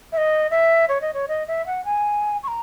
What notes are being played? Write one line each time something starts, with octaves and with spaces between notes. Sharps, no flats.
E5
D#5
E5
C#5
D#5
C#5
D#5
E5
F#5
G#5
C#6
A#5